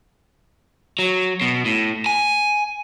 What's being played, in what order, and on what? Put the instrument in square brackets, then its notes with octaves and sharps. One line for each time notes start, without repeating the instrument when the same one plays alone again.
[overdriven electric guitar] F#3
B2
A2
G#5